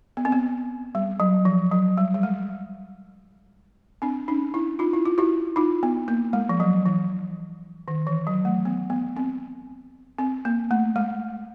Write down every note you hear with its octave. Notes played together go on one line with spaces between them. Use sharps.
B3
C4
B3
G3
F#3
F3
F#3
G3
G3
G#3
C4 D4
C#4 D#4
D4 E4
D#4 F4
E4
F4
E4 F#4
D#4 F4
B3
A#3
G#3
F3
F#3
E3
D#3
E3
F#3
A3
B3
B3
C4
C4
A#3
A3
G#3